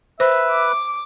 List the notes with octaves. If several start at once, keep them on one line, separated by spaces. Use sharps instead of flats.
B4 C5 E5
D6